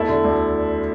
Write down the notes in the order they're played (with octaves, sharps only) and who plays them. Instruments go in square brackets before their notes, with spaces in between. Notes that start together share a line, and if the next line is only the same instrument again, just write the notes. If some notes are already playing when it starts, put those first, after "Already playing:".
Already playing: [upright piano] E2 A3 E4 A4
D3
D2